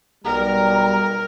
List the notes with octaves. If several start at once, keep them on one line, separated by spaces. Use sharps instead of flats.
B1 G3 A#4 A#5